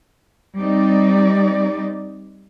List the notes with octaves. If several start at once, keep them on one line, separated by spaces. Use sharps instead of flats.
G3 C4 D#4 D5